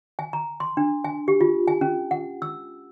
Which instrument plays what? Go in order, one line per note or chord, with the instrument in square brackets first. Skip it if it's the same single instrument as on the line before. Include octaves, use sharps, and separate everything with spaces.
[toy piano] G#5
A#5
C6
D4
G#5
G4
F4
G#5
C#4
F#5
E6